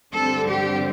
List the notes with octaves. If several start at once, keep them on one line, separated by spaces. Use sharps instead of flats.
G2 D3 G3 C4 A4
G4